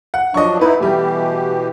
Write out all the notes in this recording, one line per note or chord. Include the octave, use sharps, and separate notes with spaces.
F#5
F3 F#3 D4 D#5 C#6
B3 D#4 E4 B4
B2 E3 G3 A3 G4